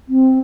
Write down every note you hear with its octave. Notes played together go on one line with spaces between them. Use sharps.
C4